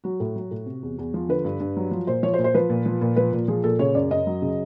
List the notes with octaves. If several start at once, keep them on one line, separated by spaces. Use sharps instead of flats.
F#3 F#4
A2
F#3
A2
C3
E2
E2
F3
D3 B4
G2
G2
F#3
F3
A#2 C5
F3 C#5
C5
A#2
C5
F3 B4
A#2
F3
A#2
F3 B4
A#2
F3 G#4
A#2 A4
C#3 C#5
F#2 D5
F#2 D#5
F#3
C#3